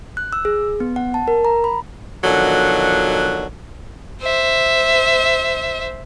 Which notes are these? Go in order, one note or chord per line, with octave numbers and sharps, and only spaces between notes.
F#6
E6
G#4
B3
F#5
A5
A#4
A#5
B5
B2 D3 D#3 F3 F#3
C5 E5